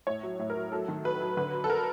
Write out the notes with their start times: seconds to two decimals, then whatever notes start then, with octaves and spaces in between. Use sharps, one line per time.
0.07 A2 C#5
0.23 F#3
0.39 A2
0.50 A#4
0.56 F#3
0.72 F#3 A4
0.88 D#3
1.04 F#3 B4
1.21 F#3
1.37 D3 B4
1.53 F#3
1.64 A4
1.70 A#4